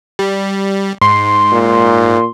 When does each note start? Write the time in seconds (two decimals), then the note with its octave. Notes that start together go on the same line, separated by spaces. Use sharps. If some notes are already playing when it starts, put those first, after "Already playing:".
0.19 G3
1.02 G#2 C6
1.52 A#2